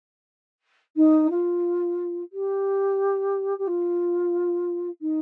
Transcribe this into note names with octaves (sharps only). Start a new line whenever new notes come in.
D#4
F4
G4
G4
F4
D#4